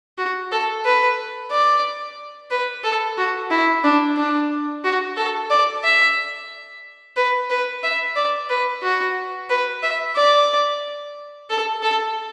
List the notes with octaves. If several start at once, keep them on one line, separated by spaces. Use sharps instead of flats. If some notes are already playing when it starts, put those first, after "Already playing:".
F#4
A4
B4
D5
B4
A4
F#4
E4
D4
D4
F#4
A4
D5
E5
B4
B4
E5
D5
B4
F#4
B4
E5
D5
A4
A4